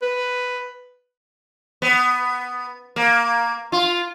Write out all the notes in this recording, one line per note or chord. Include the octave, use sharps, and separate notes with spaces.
B4
B3
A#3
F4